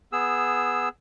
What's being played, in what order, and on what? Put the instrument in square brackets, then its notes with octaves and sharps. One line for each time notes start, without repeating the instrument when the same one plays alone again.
[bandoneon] B3 G#4 E6